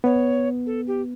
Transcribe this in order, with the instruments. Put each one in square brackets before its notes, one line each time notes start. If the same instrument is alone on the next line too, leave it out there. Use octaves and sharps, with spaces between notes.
[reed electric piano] B3 [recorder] C#5
[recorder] A4
G4